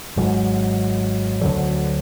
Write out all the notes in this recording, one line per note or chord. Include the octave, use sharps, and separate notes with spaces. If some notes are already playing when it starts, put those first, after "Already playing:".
G#1 G#2 F#3
D2 D3 F#3